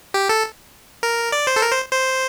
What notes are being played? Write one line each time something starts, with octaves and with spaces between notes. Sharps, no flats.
G4
A4
A#4
D5
C5
A4
A#4
C5
C5